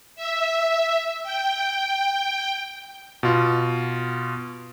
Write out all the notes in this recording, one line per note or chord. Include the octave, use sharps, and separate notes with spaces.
E5
G5
B2 F4